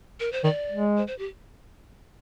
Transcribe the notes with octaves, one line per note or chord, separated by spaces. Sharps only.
A#4
C5
D#3 D5
G#3
C5
C5
G4